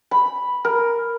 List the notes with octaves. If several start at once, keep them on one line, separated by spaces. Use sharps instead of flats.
B5
A#4